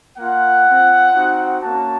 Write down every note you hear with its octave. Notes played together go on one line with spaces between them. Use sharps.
A#3 F4 F#5
C4 F4
C4 D#4 F#4
A#3 C#4 F#4 A5